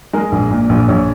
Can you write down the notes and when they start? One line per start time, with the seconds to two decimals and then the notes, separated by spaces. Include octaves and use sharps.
0.13 G#3 A#4
0.32 A#1
0.51 A#2
0.69 A#1
0.88 A#1 C#5